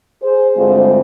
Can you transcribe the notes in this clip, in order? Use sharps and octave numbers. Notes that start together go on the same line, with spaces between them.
G#4 C5
D2 G2 G#3 C4 F4 C5